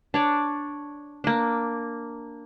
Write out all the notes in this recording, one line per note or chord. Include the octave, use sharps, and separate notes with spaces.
D4 C#5 D5
A#3 D4